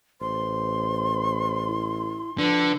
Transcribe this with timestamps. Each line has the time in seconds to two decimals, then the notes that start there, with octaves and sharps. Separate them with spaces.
0.21 A1 C5 C6
1.67 E4
2.38 D3 F3 B4